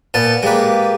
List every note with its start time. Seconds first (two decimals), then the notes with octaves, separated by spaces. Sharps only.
0.14 A#2 B3 A5
0.43 G#3 A#3 G4 B4